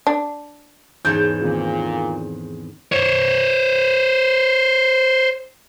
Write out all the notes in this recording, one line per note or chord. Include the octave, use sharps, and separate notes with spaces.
D4
E2 G#2 C#4 D#4 A4 G6
A#2 D#3 C4
C5 C#5